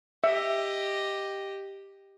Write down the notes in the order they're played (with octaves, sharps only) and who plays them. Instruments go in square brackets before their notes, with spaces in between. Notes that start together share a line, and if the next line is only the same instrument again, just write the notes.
[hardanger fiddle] G4 D#5 [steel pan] E5